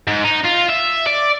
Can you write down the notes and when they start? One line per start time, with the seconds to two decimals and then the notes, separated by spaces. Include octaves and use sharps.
0.07 G#2
0.25 D#4
0.45 F4
0.70 E5
1.07 D5